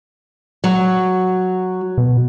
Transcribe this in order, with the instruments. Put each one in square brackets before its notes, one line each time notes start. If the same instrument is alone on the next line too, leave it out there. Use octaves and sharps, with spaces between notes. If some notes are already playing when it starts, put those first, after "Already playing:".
[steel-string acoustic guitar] F#3
[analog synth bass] B2